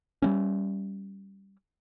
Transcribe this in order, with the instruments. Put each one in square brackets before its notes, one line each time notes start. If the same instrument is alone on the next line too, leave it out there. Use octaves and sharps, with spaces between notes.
[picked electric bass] G3 A3 C#4